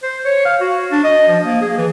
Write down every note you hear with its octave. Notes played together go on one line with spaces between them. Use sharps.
C5
C#5
F5
F#4
D4
D#5
F3
A#3
G#4
E3